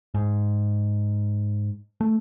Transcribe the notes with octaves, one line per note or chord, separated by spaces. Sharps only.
G#2
A3